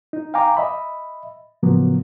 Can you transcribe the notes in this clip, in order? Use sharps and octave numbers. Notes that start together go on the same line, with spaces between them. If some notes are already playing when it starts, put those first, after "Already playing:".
D#4
F5 G5 G#5 A#5 D6
D#5 E5 B5
A2 C#3 F3 F#3 A#3 B3